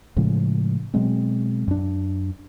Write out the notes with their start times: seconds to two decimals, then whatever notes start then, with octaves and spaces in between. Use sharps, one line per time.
0.16 A2 C#3 F3 G#3
0.94 B2 F#3 G#3 C4
1.68 F#2 D4